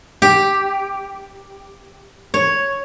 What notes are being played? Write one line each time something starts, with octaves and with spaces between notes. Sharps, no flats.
G4
C#5